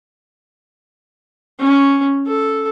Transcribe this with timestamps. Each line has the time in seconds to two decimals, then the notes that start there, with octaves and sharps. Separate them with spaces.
1.59 C#4
2.27 A4